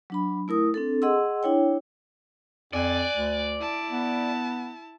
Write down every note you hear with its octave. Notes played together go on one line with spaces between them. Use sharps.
F#3 D4 B5
A3 E4 A#4 D#6
C4 D4 A4
G#4 D#5 F#5 C6 E6
D4 E4 C#5 G5
F2 D5 G#5 F#6
D2
E4 A5
B3